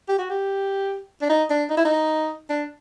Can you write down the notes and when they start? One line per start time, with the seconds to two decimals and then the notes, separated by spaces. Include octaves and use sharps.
0.09 G4
0.18 F#4
0.30 G4
1.22 D4
1.30 D#4
1.50 D4
1.70 D#4
1.77 E4
1.85 D#4
2.50 D4